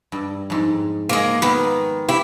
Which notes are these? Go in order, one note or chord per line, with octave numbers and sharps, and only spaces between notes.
G2
F2 G#2
G#3 A#3
D#3 B3
E4 G4 B5